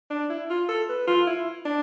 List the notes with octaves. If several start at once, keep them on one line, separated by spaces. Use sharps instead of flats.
D4
E4
F4
A4
B4
F4
E4
D4